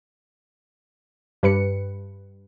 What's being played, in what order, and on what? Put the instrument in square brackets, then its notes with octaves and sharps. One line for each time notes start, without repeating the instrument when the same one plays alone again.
[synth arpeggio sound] G2 B4 C#7